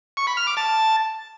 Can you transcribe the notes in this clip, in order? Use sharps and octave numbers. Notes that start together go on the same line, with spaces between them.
C#6
B5
F6
D6
A5